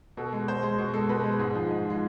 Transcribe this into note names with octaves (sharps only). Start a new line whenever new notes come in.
B2 A4
G#3
B2 C5
G#3
B2
G#3 A4
B2 B4
G#3
G#2 G#4
F3 G#3
G#2
F3 G#3